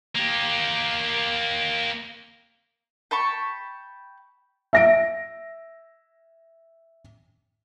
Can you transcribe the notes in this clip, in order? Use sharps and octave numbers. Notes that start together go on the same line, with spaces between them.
A#3 G4
G5 A5 B5 C#6
E5 A#6 D7